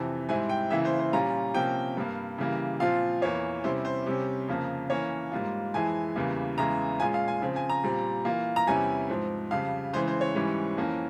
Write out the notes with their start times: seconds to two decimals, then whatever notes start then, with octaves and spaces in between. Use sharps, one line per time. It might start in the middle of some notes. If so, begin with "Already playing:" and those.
Already playing: F2 C3 E3
0.29 G#2 G3 C4 E4 G#5
0.49 G5
0.70 C#3 E3 A#3 E4 E5
0.85 C5
0.99 C5
1.12 A#2 G3 C#4 F4 A#5
1.54 C3 F3 A#3 C#4 G5
1.97 G2 G3 A#3
2.38 C#3 E3 G3 A#3
2.80 A#2 F3 C4 F4 F5
3.22 E2 E3 A#3 C#5
3.64 C3 G3 C#4 E4 C5
3.85 C5
4.06 C3 G3 C#4
4.48 F2 C#3 F3 A#3
4.90 E3 A#3 C#4 C#5
5.32 G#2 G3 A#3 F4
5.74 F2 E3 G#3 E4 G#5
6.16 E2 C#3 E3 G3 A#3
6.58 E2 C#3 E3 G#3 E4 A#5
7.00 A#2 G#3 C#4 F4 G#5
7.14 F5
7.28 G#5
7.42 C#3 F3 C4
7.56 G#5
7.70 A#5
7.83 A#2 G3 C4
8.25 E3 A#3 F4
8.56 A#5
8.67 E2 C3 G3 C#4 E4 G#5
9.09 G#2 F3 C4
9.51 F2 C#3 G3 F5
9.93 C#3 E3 G#3 C5
10.08 C5
10.21 C#5
10.35 G#2 E3 G3 C#4
10.77 F2 E3 A#3 C#4